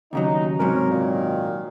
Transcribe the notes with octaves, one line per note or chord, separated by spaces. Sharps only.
D#2 C#3 F#3 D#4
G#2 C3 F#3 C#4 A#4
A#2 D#3